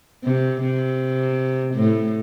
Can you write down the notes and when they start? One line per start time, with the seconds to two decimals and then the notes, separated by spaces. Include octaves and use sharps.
0.24 C3
0.62 C3
1.75 A2